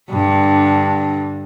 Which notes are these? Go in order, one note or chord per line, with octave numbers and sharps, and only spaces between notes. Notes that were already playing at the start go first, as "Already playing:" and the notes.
G2 D3